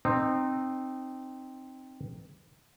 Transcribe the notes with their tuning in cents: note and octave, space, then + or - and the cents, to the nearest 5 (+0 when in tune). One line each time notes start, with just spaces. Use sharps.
C4 +0 D#4 -20